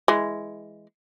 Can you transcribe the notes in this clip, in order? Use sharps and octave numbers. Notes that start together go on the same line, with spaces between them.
E3 G#3